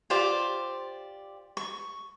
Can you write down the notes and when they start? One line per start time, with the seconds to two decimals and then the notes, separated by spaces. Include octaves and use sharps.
0.10 F4 G4 C5 D5
1.57 C#6